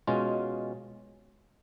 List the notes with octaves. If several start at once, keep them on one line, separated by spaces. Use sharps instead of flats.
B2 G#3 C#4 F4